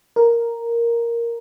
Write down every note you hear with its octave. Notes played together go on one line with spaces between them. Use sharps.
A#4